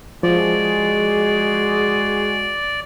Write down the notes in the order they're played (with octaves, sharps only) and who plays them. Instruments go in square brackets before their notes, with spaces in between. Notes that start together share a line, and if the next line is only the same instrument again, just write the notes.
[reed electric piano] F3 [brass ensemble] G#3 F#4 G#4 [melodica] D5